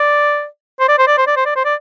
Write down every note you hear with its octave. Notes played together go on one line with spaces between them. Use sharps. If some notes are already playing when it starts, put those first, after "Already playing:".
Already playing: D5
C5
D5
C5
D5
C5
D5
C5
D5
C5
D5